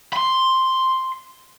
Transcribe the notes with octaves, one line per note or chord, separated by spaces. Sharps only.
B5 C6